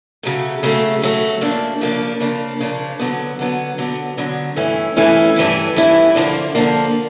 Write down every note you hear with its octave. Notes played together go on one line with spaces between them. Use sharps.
C#3 F#3 A3
C#3 F#3 A3
C#3 F#3 A3
C#3 F3 A#3 D4
C#3 F3 A#3 D4
C#3 F3 A#3 D4
C#3 F3 A#3 D4
D3 F#3 B3
D3 F#3 B3
D3 F#3 B3
D3 F#3 B3
G2 E3 A3 C#4 E4
G2 E3 A3 C#4 E4
G2 E3 A3 C#4 E4
G2 E3 A3 C#4 E4
D3 F3 A#3 D4
D3 F3 A#3 D4